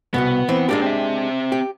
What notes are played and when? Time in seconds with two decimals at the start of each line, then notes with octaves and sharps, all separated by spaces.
0.14 C2 F2 B2 B3
0.49 E3 C4
0.69 A#2 G#3 A#3 D4 G4
0.82 C4 E5
1.52 G4